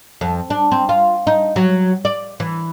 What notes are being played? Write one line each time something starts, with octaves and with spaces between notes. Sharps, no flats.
F2
D4
C4
F4
D#4
F#3
D5
E3